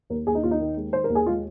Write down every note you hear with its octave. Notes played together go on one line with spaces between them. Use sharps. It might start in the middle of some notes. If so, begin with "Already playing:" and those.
D#2 A#4
D#2 G#4
D#4
D#2 F4
D#4
D#3
G#3
D#3 C5
A#4
D#2
G#4
G#3 F4